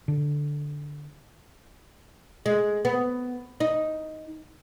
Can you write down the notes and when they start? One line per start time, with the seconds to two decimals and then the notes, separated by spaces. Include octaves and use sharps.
0.08 D3
2.46 G#3
2.85 B3
3.60 D#4